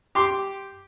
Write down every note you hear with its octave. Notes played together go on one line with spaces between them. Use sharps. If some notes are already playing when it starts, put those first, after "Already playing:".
G4 C6 D6